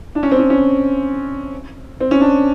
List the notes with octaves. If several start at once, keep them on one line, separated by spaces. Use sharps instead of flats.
D4
C#4
C4
C#4
C#4
C4
C#4
D4